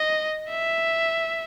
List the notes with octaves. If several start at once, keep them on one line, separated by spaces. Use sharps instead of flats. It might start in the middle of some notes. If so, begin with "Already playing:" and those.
Already playing: D#5
E5